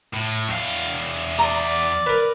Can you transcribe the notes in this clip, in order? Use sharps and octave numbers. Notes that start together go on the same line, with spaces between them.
A2
E2 F5
D5 A#5 C6
A#4 B4